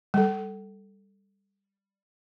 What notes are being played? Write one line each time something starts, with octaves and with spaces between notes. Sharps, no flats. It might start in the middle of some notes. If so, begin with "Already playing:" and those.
G3 A4